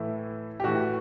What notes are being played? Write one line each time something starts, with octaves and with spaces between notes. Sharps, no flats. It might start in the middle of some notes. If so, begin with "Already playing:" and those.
Already playing: A2 E3 E4
G4
A2 E3 F#4